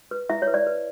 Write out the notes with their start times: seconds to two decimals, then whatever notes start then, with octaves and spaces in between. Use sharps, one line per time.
0.11 B4
0.29 E4 E5
0.42 C#5
0.48 B4
0.54 D5
0.67 B4